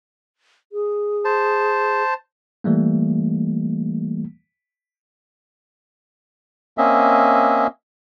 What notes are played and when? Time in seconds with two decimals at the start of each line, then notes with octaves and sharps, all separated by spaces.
0.72 G#4
1.25 C5 A5
2.64 E3 G3 A3 A#3
6.78 A#3 C4 C#4 D#5 E5